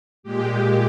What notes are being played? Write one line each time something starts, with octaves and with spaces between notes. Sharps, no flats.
A#2 G#3 G4